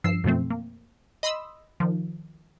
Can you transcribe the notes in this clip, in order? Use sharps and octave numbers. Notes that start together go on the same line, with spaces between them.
G2 F3 E6 C7
F#2 B2 F3 A3 C4
A#3
D#5 B5 C6 D#6 E6
D#3 F3